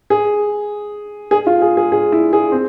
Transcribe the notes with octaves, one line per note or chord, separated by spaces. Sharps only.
G#4
G#4
F4
G#4
G#4
G#4
E4
G#4
C4